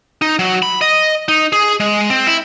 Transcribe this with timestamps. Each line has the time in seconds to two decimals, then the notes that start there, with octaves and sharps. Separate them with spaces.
0.22 D#4
0.39 F#3
0.62 B5
0.81 D#5
1.28 D#4
1.52 G#4
1.80 G#3
2.10 C4
2.27 E4